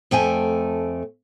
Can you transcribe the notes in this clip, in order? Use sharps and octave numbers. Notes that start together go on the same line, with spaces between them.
F2 A3 G5 G#5